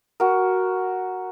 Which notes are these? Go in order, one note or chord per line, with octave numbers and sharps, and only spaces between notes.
F#4 A#4